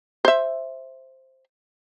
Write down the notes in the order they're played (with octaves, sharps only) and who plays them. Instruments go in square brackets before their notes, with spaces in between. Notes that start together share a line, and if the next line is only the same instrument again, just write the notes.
[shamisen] C5 E5